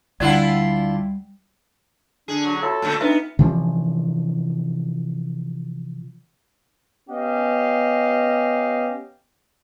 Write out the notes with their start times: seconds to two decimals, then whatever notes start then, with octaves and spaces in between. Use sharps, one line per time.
0.20 D2 D3 G3 D4 E4 F4 D5 F#5
2.28 D3 D4 G#4
2.45 F#3
2.62 F4 F#4 A4 C#5 E5
2.82 A#2 D3 A3
3.01 B3 D4 D#4 B4 E5
3.39 C3 E3 F3 C#4
7.09 B3 C#4 G4 D#5 F5